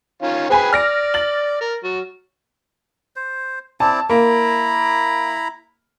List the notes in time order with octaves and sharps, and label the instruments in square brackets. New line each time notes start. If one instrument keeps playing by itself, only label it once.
[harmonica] D#3 C#4 F4
[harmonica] G#4 B4 G5 [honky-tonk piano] C5 G#5 B5
[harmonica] D5 [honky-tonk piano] F6 A#6 D7
[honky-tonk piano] A6 F#7
[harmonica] A#4
F#3
[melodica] C5
[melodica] C4 E4 D5 [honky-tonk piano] A5
[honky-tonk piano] A#3 [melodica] E4 A#5 B5